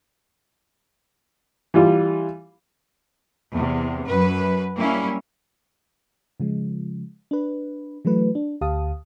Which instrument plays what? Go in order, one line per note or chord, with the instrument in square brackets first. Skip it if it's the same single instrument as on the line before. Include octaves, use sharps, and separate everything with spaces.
[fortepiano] E3 G3 F4
[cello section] E2 C3
F#2 B4
G3 A#3 C#4 E4
[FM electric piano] C#3 F3 G#3
D4 B4
E3 F#3 A3 B4
D4
D2 G4 F5 A5 D#6